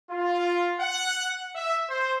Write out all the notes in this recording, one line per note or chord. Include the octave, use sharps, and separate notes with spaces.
F4
F#5
E5
C5